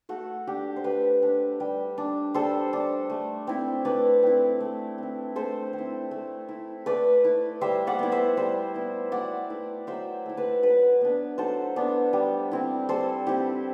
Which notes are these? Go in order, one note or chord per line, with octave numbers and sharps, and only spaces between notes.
A3 F#4 A4
D4 G4
C5
A3 G4 B4
D4
G3
D4
G3 A4 C5
D4
A3
C4 E4
A3 B4 D5
C4 E4
A3
C4 E4
A3 A4 C5
C4
E4
A3
E4
A3 B4 D5
E4
G3 C5 E5
D5 F#5
B3 E4
C5 E5
G3 C5 E5
B3 E4
F#3 D5 F#5
A3 E4
F#3 C5 E5
A3 E4
B4 D5
F#3 B4 D5
B3 D4
F#3 A4 C5
B3 D4
G3
C4 E4
G3 A4 C5
C4 E4 G4